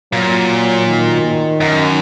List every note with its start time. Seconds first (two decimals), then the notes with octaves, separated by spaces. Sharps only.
0.12 A#2 F#3
0.86 D#3
1.61 F#2